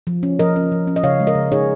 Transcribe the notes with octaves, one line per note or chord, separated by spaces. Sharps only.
F3
C#4
F3 A#4 D#5
C#4
F3
C#4
D#5
C#3 C#5 F5
G#3
A#4 D#5
C#3
D#4 G#4 C#5